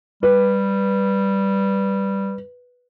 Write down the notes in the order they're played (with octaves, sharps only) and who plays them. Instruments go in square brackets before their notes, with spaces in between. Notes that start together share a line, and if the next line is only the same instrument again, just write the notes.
[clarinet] G3 [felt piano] B4